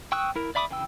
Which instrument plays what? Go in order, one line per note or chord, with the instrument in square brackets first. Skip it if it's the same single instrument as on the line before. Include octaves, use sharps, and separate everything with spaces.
[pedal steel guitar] G5 C#6 D#6 E6 F#6
E4 A#4
D5 E5 B5 D6 D#6
C#3 E3 G5 E6